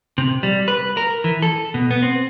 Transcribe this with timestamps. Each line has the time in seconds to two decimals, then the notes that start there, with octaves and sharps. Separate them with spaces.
0.18 C3
0.43 G3
0.68 B4
0.97 A#4
1.24 E3
1.42 A4
1.74 B2
1.91 B3
2.02 C4